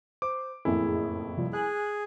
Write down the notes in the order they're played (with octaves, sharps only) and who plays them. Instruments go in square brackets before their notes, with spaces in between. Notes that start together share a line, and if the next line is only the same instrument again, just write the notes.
[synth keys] C5 [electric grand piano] D6
[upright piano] F#1 F2 A2 [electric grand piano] E4 [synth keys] G#4
[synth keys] C3 F3 G3
[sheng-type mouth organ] G#4 [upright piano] G#5 [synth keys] F#6